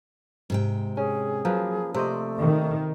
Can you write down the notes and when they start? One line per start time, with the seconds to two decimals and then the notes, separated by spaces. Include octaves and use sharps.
0.50 G#2 C3 G5
0.97 C#4 G#4
1.45 F3 F#3 A#3 B4
1.94 C3 A3 C5 D5 D#5
2.39 D#3